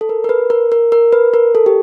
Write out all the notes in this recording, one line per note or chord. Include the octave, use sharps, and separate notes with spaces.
A4
A#4
A#4
B4
A#4
A#4
A#4
B4
A#4
A4
G4